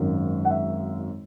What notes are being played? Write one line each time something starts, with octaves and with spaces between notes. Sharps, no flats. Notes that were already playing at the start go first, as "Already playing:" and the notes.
Already playing: G#1 F#2 D#3
F#5
E5